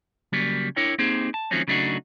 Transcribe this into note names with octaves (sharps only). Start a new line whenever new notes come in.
C#3 F#3 G3 A#3
D4 E4 A#4 C#5 G5
A#3 C4 D#4 G4 G#4 C5
A5
D#3 F3 F#3 A3 C4 C#4
C#3 F#3 A3 D4 D#4 F#4